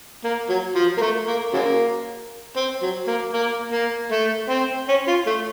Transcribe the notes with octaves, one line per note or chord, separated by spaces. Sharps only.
A#3
F#3
F3
A#3
A3
A#3
C#3 F#3 A#3
C4
F#3
A#3
A#3
A#3
A3
C4
C#4
F4
A3